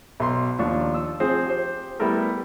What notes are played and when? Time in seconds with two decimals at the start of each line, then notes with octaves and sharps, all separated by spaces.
0.20 B1 C6
0.59 D#2 F3 D4 F4 C#6
0.94 E6
1.20 F3 C4 G#4 C5
1.47 G4 C5
2.00 G3 A3 B3 E4 A4 A#4